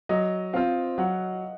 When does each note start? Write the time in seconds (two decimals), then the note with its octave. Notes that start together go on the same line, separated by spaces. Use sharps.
0.09 F#3 D#5
0.53 C4 F4 C5 F5
0.98 F#3 F#5